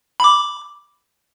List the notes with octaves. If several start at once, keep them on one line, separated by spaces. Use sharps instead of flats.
B5 D6